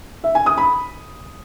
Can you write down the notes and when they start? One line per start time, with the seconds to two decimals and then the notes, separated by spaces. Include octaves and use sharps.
0.24 E5
0.35 G#5
0.46 D#6
0.58 B5